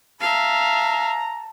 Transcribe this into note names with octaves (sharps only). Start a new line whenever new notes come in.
E5 F5 A5 A#5